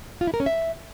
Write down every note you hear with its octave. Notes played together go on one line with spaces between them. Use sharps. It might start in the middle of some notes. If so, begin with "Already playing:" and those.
F4
E4
A#4
C#4
E5